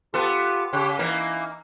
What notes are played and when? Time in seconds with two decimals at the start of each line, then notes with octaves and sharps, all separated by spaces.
0.14 B3 F4 G4 A4
0.73 C#3 G4 C#5 G5
0.98 E3 A#3 D#4